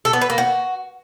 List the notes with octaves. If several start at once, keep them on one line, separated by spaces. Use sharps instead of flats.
A4
B3
B4
A#3
F#4